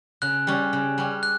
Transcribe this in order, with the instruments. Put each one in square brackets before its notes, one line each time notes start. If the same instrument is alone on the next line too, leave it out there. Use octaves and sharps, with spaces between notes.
[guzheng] C#3 [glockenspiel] F#6
[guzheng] G3 C#4
C#3
G3 C#4
[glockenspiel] F#6